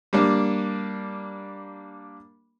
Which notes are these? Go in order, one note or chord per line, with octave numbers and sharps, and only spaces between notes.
G3 A#3 D4